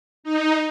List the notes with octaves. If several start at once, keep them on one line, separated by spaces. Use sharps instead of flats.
D#4